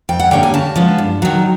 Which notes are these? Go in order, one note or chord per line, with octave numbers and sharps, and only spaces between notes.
F2 G5
F#5
D3 G3 A#3 C#4 G5
G#5
C#3 A5
F3 G#3 B3
G2
D#3 F#3